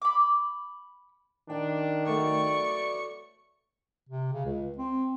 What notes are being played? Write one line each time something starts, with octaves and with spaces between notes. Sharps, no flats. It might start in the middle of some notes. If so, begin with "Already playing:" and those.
B5 D6
D#3 D4 G5
F#3 A3 B3 D5 C#6 C#7
C3
C#3
C#2
C4